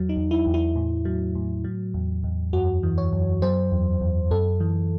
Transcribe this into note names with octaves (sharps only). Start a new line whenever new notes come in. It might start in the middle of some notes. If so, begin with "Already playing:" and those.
Already playing: E2 F#3
D#4
E2
E4
E2
E4
A2
F#3
A2
F#3
E2
E2
F#2 F#4
E3
C#5
F#2
F#3 C5
E2
E2
F#2 A4
E3